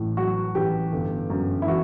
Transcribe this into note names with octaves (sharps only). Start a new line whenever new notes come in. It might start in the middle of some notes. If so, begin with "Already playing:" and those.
Already playing: A1 A2
F#3 F#4
A1 G4
G1
F#2
E4
E3 F#4